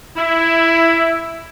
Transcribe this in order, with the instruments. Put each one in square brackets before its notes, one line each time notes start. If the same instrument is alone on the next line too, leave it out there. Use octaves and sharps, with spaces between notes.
[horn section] E4